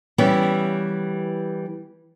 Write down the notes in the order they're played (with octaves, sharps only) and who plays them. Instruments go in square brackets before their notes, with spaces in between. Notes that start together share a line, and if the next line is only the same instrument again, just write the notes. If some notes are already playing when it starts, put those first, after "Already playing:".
[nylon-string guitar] E3 G3 B3 C#4 E4